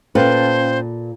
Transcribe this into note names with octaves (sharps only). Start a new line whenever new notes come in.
A#2 C#4 A4 B4 C5 F5 G5